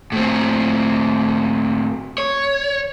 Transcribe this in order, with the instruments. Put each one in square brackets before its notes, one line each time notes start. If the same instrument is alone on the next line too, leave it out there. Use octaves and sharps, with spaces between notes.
[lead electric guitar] A2 C4
C#5